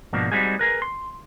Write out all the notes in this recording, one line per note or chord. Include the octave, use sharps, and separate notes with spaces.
G#2 B2 F3 A#3 D4 F#4
G3 G#3 C4 D#4 F#4 G#4
G#4 A#4 B4
C6